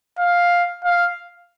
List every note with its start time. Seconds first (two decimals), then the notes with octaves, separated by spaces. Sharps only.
0.19 F5
0.84 F5